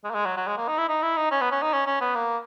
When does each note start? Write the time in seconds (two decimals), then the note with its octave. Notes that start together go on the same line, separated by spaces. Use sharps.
0.04 G#3
0.10 A#3
0.15 G#3
0.26 F#3
0.37 F#3
0.47 G#3
0.57 A#3
0.68 D#4
0.78 E4
0.89 D#4
1.03 E4
1.17 D#4
1.31 C#4
1.41 B3
1.52 C#4
1.62 D#4
1.73 C#4
1.87 C#4
2.01 B3
2.15 A#3